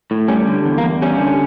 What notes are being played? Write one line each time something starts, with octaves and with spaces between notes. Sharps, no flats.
A2
G3 C#4
D3
E2
A#3
E2
G3 C#4
D3